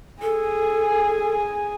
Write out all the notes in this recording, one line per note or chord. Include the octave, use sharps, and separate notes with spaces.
G#4 A4 G#5